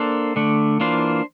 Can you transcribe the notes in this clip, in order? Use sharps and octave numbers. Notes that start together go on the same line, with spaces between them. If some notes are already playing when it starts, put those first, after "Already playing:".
Already playing: A#3 D4 A4 C5
D3 A3 D4
E3 A#3 D4 F4 C5